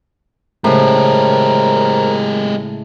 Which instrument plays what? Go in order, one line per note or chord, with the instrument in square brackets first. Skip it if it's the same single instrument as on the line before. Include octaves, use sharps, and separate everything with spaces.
[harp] A2 C#3 [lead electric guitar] G#3 G4 [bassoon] A#4 [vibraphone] C5